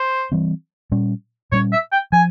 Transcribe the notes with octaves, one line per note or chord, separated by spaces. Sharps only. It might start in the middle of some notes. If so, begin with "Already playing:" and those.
Already playing: C5
E3 G3 C4
A#2 G3 C#4
A#2 G3 C#4 C#5
E5
G5
F3 G#5